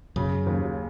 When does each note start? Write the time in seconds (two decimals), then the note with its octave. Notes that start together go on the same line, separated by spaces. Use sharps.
0.16 F#2 C#3
0.47 D#2